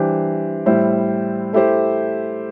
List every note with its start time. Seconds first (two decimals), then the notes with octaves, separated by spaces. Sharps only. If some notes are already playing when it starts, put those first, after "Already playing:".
Already playing: E3 G3 D4 G4 C5
0.66 A2 G3 E4 C5
1.53 A3 E4 G4 C5